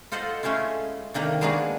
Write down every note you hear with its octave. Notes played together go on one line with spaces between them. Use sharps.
F4 A4 C5 D#5 F#5
G#3 A3 C#4 E4 F4
C3 D#3 A#3 D4
G#3 A#3 B3 D4 F#4 G#4